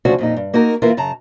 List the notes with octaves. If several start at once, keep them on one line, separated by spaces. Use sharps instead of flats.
D2 C#3 F3 C#4 D4 F#4
F2 A#2 D#4
G2
A#3 D#4 F#4 A#4
E3 A#3 E4 F4 A#4 B4
F#2 C#3 A5 A#5